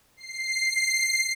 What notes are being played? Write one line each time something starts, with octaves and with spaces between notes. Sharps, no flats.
C7